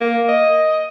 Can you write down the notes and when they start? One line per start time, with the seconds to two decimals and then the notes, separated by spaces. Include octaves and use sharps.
0.01 A#3
0.29 D#5